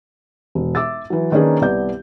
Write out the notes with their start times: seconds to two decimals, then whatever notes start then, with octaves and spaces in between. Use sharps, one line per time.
0.55 E1
0.75 E5 D6 E6 A6
1.10 E3 F#3
1.32 D#3 A#3 C#4 D4 G#4 B4
1.61 C2 B3 D5 G6